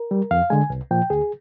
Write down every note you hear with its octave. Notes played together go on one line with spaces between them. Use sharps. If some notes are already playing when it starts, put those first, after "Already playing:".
Already playing: A#4
G3
F2 F5
D3 G#3 G#5
C2
A#2 F3 G5
D2 G#4